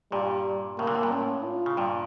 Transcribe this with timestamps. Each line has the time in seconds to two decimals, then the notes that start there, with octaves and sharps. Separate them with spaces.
0.12 G2 A#2 G3
0.78 A2 C#3 A#3
0.87 A#2 D3
0.95 A2
1.03 G2 A#2
1.11 A2 C#4
1.45 F4
1.66 C#3
1.77 G2 A#2